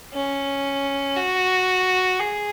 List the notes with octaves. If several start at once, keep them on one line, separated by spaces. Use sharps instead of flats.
C#4
F#4
G#4